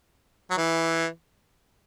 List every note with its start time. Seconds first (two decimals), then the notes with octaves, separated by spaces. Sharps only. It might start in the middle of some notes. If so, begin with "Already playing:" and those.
0.50 F#3
0.57 E3